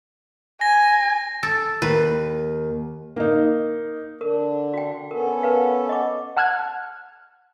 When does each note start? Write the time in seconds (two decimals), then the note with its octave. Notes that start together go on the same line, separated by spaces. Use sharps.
0.61 G#5 A#6
1.43 A4
1.82 D#2 B4
3.16 A#3 D#4
4.21 D3 D4 A#4
4.74 F#4 G5
5.11 B3 C#4 A4 A#4
5.43 A#4 B4 F5
5.89 D#5 D6
6.37 F#5 A5 F6 F#6 G#6